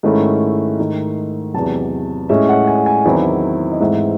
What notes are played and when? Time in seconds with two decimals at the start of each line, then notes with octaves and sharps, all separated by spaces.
0.03 G#2 D#3 A3 C#4 E4
0.79 G#2 D#3 A3 D#4
1.54 E2 C3 F#3 A5
2.29 A2 G#3 C#4 E5
2.49 F#5
2.67 G#5
2.86 G#5
3.05 E2 D#3 F#3 C4 E4
3.72 D#5
3.80 G#2 E3 A3 C4 E5